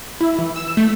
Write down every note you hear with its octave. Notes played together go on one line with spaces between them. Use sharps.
E4
E3
E6
A3